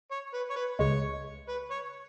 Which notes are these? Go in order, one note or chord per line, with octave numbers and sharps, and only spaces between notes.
C#5
B4
C#5
B4
C#2 C#3 G#3 C#5
B4
C#5